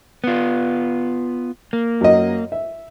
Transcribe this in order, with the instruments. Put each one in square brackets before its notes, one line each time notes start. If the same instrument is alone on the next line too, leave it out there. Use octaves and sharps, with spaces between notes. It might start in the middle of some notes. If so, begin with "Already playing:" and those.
[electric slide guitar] B3 F4
A#3
[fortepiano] F#2 D#5
E5